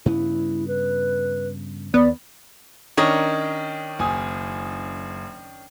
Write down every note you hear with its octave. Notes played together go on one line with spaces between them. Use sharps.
G2 C#3 B3 E4
B4
D#2 B3 D5
D#3 C#4 D4 A#4 C#5 D#5
F#1 G#5 D#6